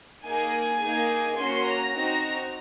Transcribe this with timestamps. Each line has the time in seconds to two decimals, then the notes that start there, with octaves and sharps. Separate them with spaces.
0.25 A#3 D#4 G#4 G#5
0.82 A#3 D#4 G#4
1.37 A#3 C#4 F#4 C6
1.66 A#5
1.94 C4 D#4 F#4